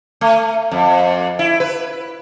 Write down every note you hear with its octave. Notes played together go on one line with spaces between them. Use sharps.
A3
F2
E4
B4